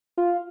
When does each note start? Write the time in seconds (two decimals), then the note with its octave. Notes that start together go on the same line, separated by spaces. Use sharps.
0.17 F4